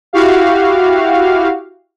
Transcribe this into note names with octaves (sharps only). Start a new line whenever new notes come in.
E4 F#4 G4 F5